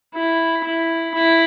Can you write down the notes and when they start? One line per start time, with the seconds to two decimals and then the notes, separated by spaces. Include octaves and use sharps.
0.15 E4
0.64 E4
1.14 E4